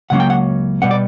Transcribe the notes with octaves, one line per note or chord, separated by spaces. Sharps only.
C#2 C#3 F#3 A#3 C#4 F#5
G5
F#5
B2 G3 B3 F#5
D5